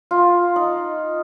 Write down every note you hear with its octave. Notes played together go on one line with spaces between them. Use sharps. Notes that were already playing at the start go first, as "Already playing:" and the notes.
F4
D#4